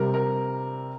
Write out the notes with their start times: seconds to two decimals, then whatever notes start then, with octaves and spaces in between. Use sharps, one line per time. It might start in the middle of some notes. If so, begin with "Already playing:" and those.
Already playing: C3 G3 C4 A#4
0.14 A#4